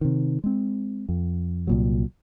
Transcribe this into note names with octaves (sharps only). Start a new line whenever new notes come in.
C3 D#3
G#3 C4
F2
C2 A#2 F#3